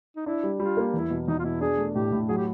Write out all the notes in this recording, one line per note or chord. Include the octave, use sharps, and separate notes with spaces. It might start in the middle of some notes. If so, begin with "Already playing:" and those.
D#4
D4 E4
G3
G3 F4
A#3
E2 E4
B2
E2 D#4
F4
B2 E4
D4 G#4
A3
A2 G4
A2
F#3 G#4
G4